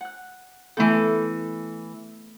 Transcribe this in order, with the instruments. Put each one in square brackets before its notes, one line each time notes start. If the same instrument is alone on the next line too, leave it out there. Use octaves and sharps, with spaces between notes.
[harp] F#5 F#6
[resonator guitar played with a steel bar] E3 A4 [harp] A3 B3 G6